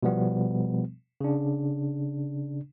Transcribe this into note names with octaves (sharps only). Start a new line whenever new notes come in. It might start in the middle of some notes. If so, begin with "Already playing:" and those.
B2 F3 G3 B3
C#3 D4